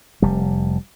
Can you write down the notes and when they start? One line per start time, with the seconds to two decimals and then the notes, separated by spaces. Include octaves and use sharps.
0.22 F1 G3